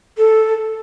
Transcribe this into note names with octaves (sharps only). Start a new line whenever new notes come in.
A4